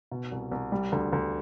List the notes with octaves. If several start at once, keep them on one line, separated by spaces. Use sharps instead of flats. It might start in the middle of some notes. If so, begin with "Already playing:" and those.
B2
C2
C2
G3
D2
D2